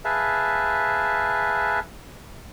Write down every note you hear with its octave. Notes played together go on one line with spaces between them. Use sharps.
G#4 B4 E5 F5 A5